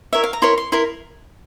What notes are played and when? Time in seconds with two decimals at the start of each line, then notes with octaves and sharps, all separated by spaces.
0.13 E4 A#4 C#5 E5
0.24 F5
0.33 A#5
0.42 E4 A#4 C#5 C6
0.58 C6
0.72 E4 A#4 C6